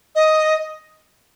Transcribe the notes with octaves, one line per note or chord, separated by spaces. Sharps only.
D#5